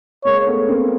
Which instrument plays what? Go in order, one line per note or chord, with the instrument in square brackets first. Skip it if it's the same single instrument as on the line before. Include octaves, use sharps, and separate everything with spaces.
[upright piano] G#3 A#3 [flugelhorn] C#5
[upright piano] A3 B3
A#3 C4